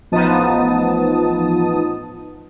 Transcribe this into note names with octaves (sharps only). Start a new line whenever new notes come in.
A1 F3 B3 D#4 A5 D#6